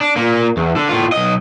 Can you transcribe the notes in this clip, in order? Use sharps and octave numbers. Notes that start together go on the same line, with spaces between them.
D4
A#2 A#3
E2
D3
A2 F4
B1 D#5